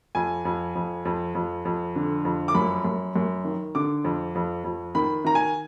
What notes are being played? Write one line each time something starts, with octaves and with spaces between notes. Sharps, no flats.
F2 G#5
F2
F2
F2
F2
F2
D3
F2
D6
F#2 B5
F#2
F#2
D#3
D3 D6
F2
F2
F2
D#3 B5
D#3 A#5
G#5